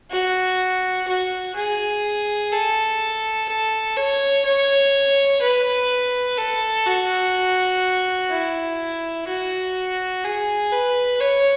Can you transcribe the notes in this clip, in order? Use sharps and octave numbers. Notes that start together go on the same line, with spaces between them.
F#4
F#4
G#4
A4
A4
C#5
C#5
B4
A4
F#4
E4
F#4
G#4
B4
C#5